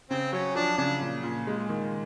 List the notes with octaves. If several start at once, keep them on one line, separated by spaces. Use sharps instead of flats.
C#3 C4
F#3 C#4
F3 D4
C#3 D4
A#2
A#2
G#3
D#3